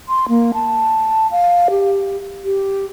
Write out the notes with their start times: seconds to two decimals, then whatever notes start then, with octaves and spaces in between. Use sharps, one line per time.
0.09 C6
0.29 A#3
0.54 A5
1.31 F5
1.70 G4
2.45 G4